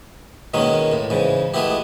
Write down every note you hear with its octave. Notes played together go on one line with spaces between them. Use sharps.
B2 D#3 G#3 A#3 C#4
A2
G#2 C#3 E3
G#3 A3 B3 E4 G4